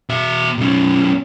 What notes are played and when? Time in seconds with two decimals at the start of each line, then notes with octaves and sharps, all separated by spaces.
0.09 B2 E5
0.58 B1 C#4